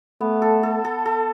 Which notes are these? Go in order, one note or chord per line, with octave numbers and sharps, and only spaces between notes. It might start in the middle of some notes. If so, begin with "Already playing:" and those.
A3 B3
A4
A4
A4
A4